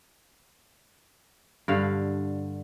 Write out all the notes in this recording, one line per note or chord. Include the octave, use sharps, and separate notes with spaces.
G2 D3 F5